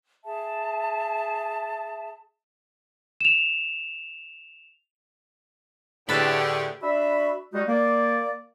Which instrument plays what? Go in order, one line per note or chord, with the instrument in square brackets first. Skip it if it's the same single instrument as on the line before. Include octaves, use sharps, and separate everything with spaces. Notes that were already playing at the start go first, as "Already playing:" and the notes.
[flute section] G#4 E5 A5
[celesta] E7 F7
[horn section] A2 D3 [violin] G4 G#4 [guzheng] B4 A5 B5
[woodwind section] D4 F#4 E5 B5
G3 G#3 D#4 F#4
A#3 D5